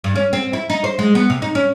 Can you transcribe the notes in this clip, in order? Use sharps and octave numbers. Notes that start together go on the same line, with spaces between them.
G2
C#4
C4
E4
D#4
C5
G#3
B3
C3
D#4
C#4